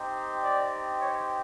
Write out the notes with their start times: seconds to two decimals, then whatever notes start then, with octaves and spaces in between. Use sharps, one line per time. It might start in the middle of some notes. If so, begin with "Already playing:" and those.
Already playing: C4 D#4 G4
0.44 D5
1.01 C#5